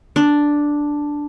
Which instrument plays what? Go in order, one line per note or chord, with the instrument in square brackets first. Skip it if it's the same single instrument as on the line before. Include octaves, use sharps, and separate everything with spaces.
[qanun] D4